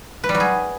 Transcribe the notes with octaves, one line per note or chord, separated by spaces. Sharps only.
B4
G3
F#3
G#4